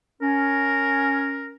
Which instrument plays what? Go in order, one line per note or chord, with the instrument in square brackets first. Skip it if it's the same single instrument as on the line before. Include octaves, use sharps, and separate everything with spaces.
[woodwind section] C#4 [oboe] A#4